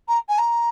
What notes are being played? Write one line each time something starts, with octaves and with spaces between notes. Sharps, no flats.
A#5
G#5
A#5